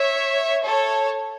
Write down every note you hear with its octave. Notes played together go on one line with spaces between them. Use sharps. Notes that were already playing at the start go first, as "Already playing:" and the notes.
Already playing: C#5 E5
A4 C#5